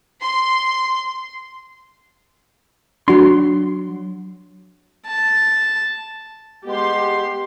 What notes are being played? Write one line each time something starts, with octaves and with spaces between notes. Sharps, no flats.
C6
F#3 D4 F#4 C6
A5
G#3 B3 G4 C6